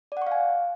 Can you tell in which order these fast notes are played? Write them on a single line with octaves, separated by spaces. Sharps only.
D5 F#5 C#6 F5 G#5